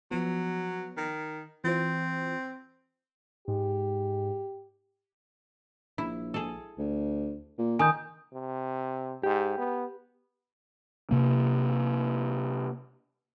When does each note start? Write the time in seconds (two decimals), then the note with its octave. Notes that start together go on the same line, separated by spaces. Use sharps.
0.11 F3 F#3 B3
0.97 D#3
1.64 E3 C4 F4 C5
3.48 G#2 G4
5.98 A#1 E4
6.34 G#4 A4
6.78 D2
7.59 A#2
7.79 D#3 G#5 D#6 G6
8.33 C3
9.23 G#2 G4
9.58 B3
11.11 C3 A#3